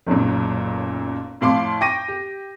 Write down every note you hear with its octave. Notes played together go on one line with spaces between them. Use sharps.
F#1 B1 F#2 A#2
F2 A2 F5 C6 D6
G5 C#6 D6 A#6 D#7
G4